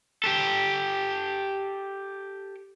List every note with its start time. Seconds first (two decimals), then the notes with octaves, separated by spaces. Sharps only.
0.24 G4 A4